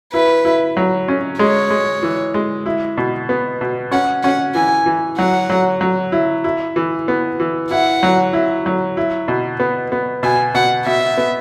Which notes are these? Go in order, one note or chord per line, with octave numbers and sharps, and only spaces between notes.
E4 B4
E4
F#3
C#4
G#3 C#5
G#3
E3
G#3
E4
B2
B3
B2
C#4 F#5
C#4 F#5
E3 G#5
E3
F#3 F#5
F#3
F#3
E4
E4
E3
B3
E3
E4 F#5
F#3
E4
F#3
E4
B2
B3
B3
B2 G#5
B2 F#5
B2 E5
B3